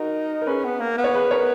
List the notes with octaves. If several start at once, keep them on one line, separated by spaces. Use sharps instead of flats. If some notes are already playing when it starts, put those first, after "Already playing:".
Already playing: D#4 F#4 A#4
A#4
C#4 G#4 B4
B3
A#3
B3
C#5
G#4 B4
A#4 C#5